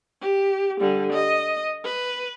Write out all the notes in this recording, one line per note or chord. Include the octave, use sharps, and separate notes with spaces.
G4
D3 G3
D#5
B4